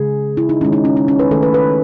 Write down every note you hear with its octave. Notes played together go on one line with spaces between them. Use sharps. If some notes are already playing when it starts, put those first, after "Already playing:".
Already playing: C#3 G#3 G#4
E4
D#4
D#3 G#3 C#4
D#4
C#4
C#4
C#4
B4
D#3 A3 A4
B4
B4